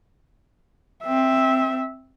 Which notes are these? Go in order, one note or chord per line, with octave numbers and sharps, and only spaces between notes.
C4 E5